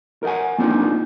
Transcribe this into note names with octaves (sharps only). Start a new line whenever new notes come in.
A#4 D#5 E5 F#5 G#5
A#3 C4 D4 D#4 F4